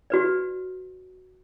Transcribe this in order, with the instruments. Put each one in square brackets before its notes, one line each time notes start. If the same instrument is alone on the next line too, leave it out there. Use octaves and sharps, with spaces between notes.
[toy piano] F#4 B4 D5